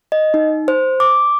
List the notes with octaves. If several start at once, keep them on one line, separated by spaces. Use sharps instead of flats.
D#5
D#4
C5
D6